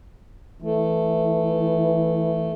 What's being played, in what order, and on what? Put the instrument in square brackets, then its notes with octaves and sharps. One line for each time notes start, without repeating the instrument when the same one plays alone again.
[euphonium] E3 [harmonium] A3